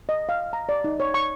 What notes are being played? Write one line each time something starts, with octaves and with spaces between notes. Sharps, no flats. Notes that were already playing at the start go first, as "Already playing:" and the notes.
D#5
F5
A#5
D5
D#4
C#5
C#6